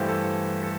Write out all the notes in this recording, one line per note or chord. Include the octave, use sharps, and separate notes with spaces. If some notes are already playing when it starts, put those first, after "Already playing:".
Already playing: G2 E3 A3 E4 G4 C5 F5
A4
A4